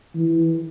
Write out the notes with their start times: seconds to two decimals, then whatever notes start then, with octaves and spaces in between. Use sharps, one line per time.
0.15 E3